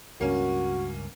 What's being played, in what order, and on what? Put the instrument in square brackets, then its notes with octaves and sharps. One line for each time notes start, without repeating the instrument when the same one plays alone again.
[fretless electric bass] C#2 G2 [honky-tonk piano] A#3 C#4 [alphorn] F#4